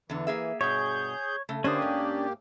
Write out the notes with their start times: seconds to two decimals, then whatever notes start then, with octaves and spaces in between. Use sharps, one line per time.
0.10 E2 D3 E3
0.27 A#3 G#4 E5
0.61 G2 B2 G#4 C#5 G6
1.49 C#3 A3
1.64 D3 A#3 C#4 D4 G4 C5 D#6
1.82 G#2